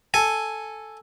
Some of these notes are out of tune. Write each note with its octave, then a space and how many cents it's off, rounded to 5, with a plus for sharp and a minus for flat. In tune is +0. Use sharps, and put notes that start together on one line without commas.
A4 +0 G#5 +0